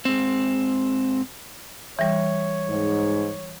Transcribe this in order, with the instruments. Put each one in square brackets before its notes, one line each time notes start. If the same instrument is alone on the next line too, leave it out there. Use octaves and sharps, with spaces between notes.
[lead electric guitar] G#2 C4
[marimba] E3 G3 [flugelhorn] C#5
[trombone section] G#2